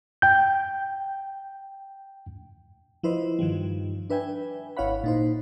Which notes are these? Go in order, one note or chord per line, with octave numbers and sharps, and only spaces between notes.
G5 G6
F3 E4 B4 C5 D#5
G2 D#3 F3 G3
D4 B4 E5 G5 G#5
G#1 E4 C#5 F5 F#5 B5
A#2 D#4 C5